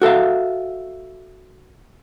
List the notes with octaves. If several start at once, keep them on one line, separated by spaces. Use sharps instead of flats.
F#4 A4 E5 F5